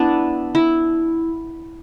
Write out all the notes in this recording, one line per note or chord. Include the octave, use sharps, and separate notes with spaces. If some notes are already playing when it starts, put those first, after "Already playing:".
Already playing: B3 D4 E4
E4